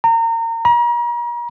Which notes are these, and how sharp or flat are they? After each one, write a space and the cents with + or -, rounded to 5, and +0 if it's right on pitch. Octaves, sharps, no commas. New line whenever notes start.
A#5 -30
A#5 +40